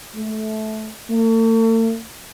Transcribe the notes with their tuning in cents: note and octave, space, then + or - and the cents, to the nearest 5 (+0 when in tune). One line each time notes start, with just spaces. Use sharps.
A3 -20
A3 +45